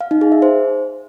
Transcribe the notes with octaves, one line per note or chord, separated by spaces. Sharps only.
F5
D#4
G#4
E5
C5